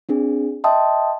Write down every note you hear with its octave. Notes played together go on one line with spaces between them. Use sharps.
C4 D4 G#4
D#5 E5 G5 A5 C6 D#6